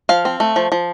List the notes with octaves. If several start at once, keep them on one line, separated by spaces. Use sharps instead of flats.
F3 F5
C4
A3
F3
F3